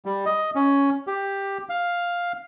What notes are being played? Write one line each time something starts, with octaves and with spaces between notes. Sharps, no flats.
G3
D#5
C#4
G4
F5